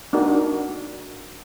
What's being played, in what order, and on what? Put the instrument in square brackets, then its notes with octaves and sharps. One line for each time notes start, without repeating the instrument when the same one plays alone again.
[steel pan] D4 D#4 F#4 A#4